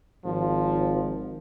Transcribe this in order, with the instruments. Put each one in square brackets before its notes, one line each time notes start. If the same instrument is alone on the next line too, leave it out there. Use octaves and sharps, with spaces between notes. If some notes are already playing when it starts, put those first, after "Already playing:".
[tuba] G#1 [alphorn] F3